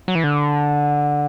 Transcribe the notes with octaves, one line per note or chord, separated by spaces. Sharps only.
F#3
E3
D3